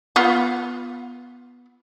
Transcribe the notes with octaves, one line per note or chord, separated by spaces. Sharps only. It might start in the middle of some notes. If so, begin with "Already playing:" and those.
B3 F4 F#5